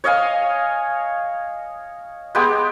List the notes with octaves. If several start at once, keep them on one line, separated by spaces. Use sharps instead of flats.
C#5 D#5 F5 G#5
G#3 B3 G4